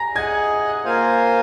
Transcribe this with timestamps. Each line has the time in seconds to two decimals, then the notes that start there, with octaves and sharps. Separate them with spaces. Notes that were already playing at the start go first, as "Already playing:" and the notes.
Already playing: G#5 A#5 A#6
0.15 G#4 D#5 F#5 G#5 G#6
0.85 A#3 F4 C5 F5 G#5